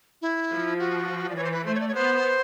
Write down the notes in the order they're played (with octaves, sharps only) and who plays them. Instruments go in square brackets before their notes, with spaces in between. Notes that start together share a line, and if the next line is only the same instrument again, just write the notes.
[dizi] E4
[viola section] F3
[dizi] F#4
D5
[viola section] E3 [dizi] C#5
[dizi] C5
B4
[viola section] A3 [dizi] C5
[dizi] C#5
D5
C#5
[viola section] B3 [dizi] C5